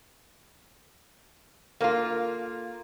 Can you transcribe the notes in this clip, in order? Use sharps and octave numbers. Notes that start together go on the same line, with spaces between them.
A#3 F4 A4 A#4 F5